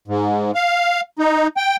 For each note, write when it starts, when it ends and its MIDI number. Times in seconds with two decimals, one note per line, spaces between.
0.08 0.51 44
0.55 1.01 77
1.19 1.47 63
1.57 1.76 79